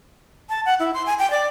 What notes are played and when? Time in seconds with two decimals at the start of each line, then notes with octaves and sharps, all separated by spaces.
0.49 A5
0.66 F#5
0.80 E4
0.94 C6
1.06 G#5
1.19 G5
1.31 D5